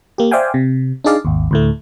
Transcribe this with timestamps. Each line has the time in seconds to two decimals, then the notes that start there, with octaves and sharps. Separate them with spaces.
0.18 A#3 G4
0.31 C5 D5 E5 F5 G5 G#5
0.54 C3
1.04 D4 D#4 G#4 D5 F5
1.25 G#1 D#2
1.51 D2 A2 A3